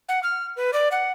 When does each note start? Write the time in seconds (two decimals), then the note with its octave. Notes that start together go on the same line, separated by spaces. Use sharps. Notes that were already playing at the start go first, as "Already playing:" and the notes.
0.09 F#5
0.23 F6
0.56 B4
0.73 D5
0.92 F#5